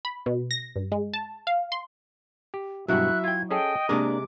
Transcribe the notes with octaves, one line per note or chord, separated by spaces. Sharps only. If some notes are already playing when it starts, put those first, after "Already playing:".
B5
B2
A#6
G2
G#3
A5
F5
C6
G4
G2 B2 F#3 E4 F#4 E5 F#6
F4 G5 G#6
C#4 G#4 A4 D#5 G5
C3 G#3 A#3 D4 A#4 D6